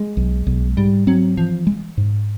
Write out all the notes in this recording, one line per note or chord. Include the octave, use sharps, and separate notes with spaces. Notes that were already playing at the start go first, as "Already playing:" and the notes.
Already playing: G#3
B1
B1
G#2 G3
F#3 C4
E3 F3
G#3
G#2